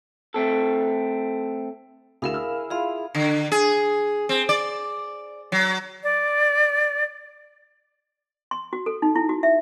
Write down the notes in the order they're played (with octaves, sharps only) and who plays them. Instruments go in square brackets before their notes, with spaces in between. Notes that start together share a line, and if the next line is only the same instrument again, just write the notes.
[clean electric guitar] A3 C4 A4
[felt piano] D2 F#4 E7 [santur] E4 G#4 [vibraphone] A#4 F5
[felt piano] E6 F6
[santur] E4 F4 [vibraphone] G#4 F5
[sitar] D3
G#4
C4
D5
F#3
[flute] D5
[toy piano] C6
F#4
A4
D#4
E4
F#4
E5